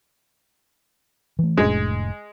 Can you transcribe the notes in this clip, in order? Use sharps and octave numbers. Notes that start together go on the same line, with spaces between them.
E3 A3
F1 A2 G#3 D4